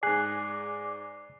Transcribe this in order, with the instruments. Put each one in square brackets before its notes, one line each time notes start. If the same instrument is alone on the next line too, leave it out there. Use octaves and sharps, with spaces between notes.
[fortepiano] G#2 G#4 [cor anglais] D5 [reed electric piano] G#5 F#6 [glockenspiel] C7